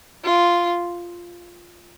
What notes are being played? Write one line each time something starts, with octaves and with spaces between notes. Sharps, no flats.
F4